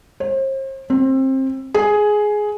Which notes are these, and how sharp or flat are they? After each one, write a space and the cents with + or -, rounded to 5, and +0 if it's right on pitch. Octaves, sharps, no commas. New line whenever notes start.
C5 +40
C4 +25
G#4 +10